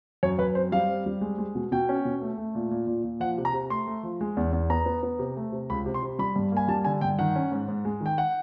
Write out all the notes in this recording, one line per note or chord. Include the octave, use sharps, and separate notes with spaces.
F#2 C#5
F#2 B4
C4 C5
G3 F5
C4
G3
G#3
G#3
B2
B2 G5
C#4
B2
A3
A3
A#2
A#2
A#2
A#2
F3 F#5
C3
A#5
C3
A3 C6
A3
F3
G#3
E2
E2
B3 A#5
B3
B3
C3
A3
C3
C#2 B5
C3
C6
C3
G3 B5
G2
A#3 G#5
G3 A5
D3 G#5
G2 G5
D#3 F#5
C#4
G#2
G#2
G#3
D#3
G5
F#5